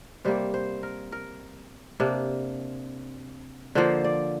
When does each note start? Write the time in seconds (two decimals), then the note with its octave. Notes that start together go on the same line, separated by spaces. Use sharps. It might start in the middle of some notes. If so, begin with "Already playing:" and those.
0.25 C3 G3 A#3 C5
0.54 C5
0.83 A#4
1.12 A#4
2.00 C3 A#3 D4
3.75 D3 F3 A#3 C5
4.04 D5